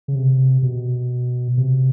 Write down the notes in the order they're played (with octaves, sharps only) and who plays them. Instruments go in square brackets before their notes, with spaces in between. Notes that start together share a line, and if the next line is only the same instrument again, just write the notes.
[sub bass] C#3
C3
B2
C3